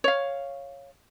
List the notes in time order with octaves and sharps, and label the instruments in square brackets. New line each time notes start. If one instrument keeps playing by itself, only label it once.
[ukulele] C#5 F5